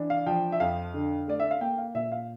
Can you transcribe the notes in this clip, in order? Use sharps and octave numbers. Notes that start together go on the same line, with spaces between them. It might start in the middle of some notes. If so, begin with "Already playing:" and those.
Already playing: E3 D4
F5
F3 G5
E5
F2 F5
D3
A3 D5
E5
F5
A#3 G5
F5
A#2 E5
F5